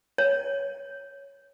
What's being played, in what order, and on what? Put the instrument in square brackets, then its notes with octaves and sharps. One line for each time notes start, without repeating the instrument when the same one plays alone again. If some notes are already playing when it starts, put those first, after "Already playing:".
[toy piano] C#5